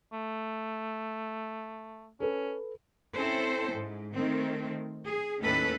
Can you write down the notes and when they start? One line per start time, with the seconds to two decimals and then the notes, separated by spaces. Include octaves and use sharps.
0.13 A3
2.20 C#4 A4 B4
3.14 C4 C#4 E4 A4 C5
3.72 G#2
4.14 D#3 A3 C4
5.06 G#4
5.41 D#2 A2 D#3 C#4 A4 B4